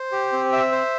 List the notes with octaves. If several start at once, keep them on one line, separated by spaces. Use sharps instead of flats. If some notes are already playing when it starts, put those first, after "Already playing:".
Already playing: C5
G4
C4
E5
C5